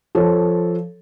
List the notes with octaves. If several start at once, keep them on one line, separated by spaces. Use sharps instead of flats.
F3 A4 C#5